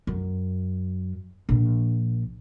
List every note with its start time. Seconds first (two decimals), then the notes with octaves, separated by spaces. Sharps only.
0.07 F#2
1.49 A#1